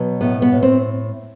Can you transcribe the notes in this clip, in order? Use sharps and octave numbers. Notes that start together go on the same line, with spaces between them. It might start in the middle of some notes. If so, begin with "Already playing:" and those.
Already playing: B2 F#3
A2 B3
B3
A2
C4